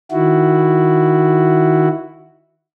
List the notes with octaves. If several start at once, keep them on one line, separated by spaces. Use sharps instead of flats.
D#3 E4 F#4